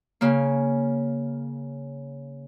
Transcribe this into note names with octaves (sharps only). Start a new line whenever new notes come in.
C#3 A#3